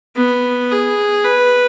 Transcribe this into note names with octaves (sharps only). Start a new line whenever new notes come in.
B3
G#4
B4